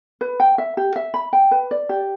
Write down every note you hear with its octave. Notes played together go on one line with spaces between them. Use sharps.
B4
G5
E5
G4
E5
B5
G5
B4
D5
G4